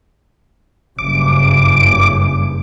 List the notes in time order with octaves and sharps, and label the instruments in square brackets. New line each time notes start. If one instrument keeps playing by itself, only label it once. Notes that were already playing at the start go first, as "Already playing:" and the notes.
[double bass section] F#1 G2 C#3 [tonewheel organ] D6